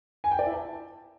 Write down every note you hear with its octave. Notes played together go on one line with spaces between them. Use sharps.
G#5
G5
D5
E4
A5